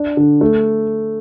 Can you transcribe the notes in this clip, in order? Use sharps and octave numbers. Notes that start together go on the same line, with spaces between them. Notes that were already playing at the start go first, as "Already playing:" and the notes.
Already playing: D4
D3
A3